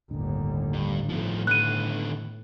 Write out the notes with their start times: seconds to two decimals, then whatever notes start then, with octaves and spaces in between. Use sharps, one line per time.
0.11 G1 D#2 A2 D3
0.73 G2
1.09 A2 D#3 F3 B3
1.47 D3 B3 F#6 D#7